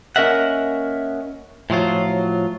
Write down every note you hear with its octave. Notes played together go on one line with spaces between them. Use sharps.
A#3 C#4 A#4 D#5 E5 F#5
A2 F3 F#3 F4